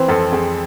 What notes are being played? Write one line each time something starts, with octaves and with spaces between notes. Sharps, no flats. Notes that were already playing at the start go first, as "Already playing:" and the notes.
Already playing: E3 C4 C5
F2 A4
F2 G#4